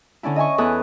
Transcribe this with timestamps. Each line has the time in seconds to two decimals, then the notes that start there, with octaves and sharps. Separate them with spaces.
0.23 D3 C#4 D4 E4
0.36 D#5 E5 G#5 C#6
0.58 E2 A4 B4 G#5 D#6 F#6